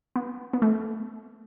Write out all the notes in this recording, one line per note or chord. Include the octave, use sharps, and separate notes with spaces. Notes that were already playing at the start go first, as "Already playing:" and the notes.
B3
B3
A3